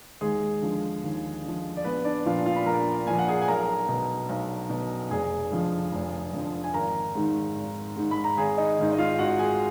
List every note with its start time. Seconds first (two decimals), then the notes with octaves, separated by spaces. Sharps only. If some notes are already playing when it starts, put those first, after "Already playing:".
0.21 D#2 G#3 G#4
0.62 D3 F3
1.03 D#2
1.44 D3 F3
1.77 D5
1.84 A#1 B3 B4
2.04 D4 D5
2.26 A#2 F3 F4 F5
2.46 F4 F5
2.56 B5
2.66 A#1 A#4 A#5
3.06 A#2 F3 G#5
3.18 F#5
3.28 G#4 G#5
3.42 G#5
3.48 B1 A#4 A#5
3.88 B2
4.29 B1
4.70 B2
5.10 F1 G#4 G#5
5.52 F2 D3 F3
5.93 F1
6.33 F2 D3 F3
6.63 G#5
6.74 G#1 A#4 A#5
7.15 G#2 D#3
7.56 G#1
7.96 G#2 D#3
8.11 B5
8.24 A#5
8.37 G#1 G#4 G#5
8.57 D#4 D#5
8.78 G#2 D#3
8.92 D#5
8.98 F4 F5
9.19 G#1 F#4 F#5
9.39 G#4 G#5